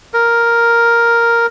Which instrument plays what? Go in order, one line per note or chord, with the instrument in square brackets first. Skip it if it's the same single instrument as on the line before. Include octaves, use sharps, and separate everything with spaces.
[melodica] A#4